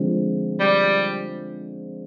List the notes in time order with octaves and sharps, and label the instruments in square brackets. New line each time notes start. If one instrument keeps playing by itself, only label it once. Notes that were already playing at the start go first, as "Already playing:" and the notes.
Already playing: [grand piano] D3 F3 G#3 C4
[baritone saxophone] G3